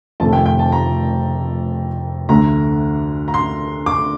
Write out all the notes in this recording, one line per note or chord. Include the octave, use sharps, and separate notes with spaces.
F1 F2 D#3 A3 A5
G5
G5
A5
A#5
D2 D3 A3 A#5
A#5
C6
D6